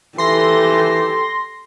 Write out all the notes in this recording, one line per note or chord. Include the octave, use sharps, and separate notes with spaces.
E3 G4 A4 C6 A#6